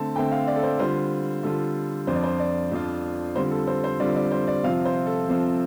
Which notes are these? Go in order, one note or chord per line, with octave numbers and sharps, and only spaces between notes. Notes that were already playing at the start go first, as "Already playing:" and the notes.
Already playing: D3 A3 C4 A5
D3 A3 C4 G5
F5
D5
A4
C5
D3 G3 F4 C5
D3 G3 F4 A4
F2 F3 D4 F4 C5
D5
C5
D5
F2 F3 D4 F4
D3 G3 C4 F4 C5
A4
C5
C5
D3 G3 C4 F4 D5
D5
C5
D5
C3 F3 C4 F4 F5
C5
A4
C3 F3 C4 F4